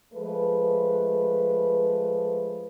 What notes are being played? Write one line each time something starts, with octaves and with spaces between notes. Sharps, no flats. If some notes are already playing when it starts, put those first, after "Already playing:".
F3 G#3 A3 B4